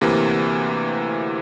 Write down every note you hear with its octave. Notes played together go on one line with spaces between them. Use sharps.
D2 C3 E3 A#3